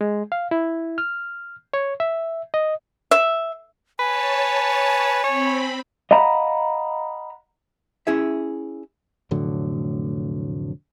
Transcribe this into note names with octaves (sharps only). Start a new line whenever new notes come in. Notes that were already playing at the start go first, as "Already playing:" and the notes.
G#3
F5
E4
F6
C#5
E5
D#5
E5
B4 C#5 G#5 A5
C4 C#5 B5
D#5 F5 F#5 A#5 B5
C#4 E4 G#4 E5
F1 A2 D3 F#3